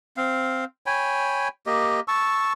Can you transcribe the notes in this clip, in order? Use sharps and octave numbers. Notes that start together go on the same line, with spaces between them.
C4 F5
C#5 G5 G#5 B5
A#3 G4 D#5
A5 C#6 E6